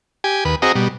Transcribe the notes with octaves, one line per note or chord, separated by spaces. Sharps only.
G4 G#5
D#2 B4
C4 F#4 G#4 D#5 A#5
B2 G3